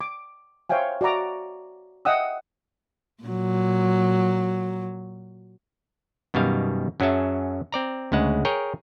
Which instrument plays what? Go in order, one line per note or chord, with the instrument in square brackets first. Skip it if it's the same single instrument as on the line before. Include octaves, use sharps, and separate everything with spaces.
[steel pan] D6
C5 C#5 E5 F5 G5 G#5
F#4 D5 E5 A#5 D6
D#5 E5 F#5 G5 D#6 E6
[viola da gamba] A#2 F#3
[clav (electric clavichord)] F#2 B2 D#3 G3 F5
F#2 F#3 C#4 G#4 E5 A5
C4 D5 A#5
D2 C#3 G#3 F#5
G#4 A#4 C#5 G5